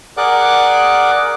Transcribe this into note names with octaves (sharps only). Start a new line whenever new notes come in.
G#4 A#4 D5 F#5 D6 F#6